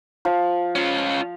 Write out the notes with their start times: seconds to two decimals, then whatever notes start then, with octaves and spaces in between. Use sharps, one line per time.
0.25 F3
0.75 C#4 F4